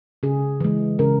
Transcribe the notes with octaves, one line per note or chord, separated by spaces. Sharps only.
C#3 G#4
E3 G#3
C#3 A#4